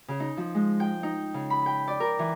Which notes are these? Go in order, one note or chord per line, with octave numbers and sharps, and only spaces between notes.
C#3
D#4
F3
G#3
G5
D#4
C#3
B5
G5
D5
A#4
E3